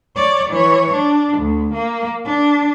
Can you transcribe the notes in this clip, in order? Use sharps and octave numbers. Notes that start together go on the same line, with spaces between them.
C#5 D5
E3 C#5
D4
D2
A#3
D4